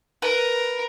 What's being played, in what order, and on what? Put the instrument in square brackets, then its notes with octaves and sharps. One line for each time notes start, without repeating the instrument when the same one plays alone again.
[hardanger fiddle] A#4 [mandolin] B4